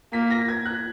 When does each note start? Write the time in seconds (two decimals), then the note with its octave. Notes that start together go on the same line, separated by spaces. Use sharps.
0.13 A#3 B6
0.31 A#6
0.48 G#6
0.65 F#6